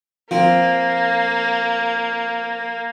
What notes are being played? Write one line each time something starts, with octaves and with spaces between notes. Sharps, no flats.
F3 A#3 C4